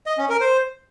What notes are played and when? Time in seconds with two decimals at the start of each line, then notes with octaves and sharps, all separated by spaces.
0.06 D#5
0.18 C#4
0.29 A#4
0.41 C5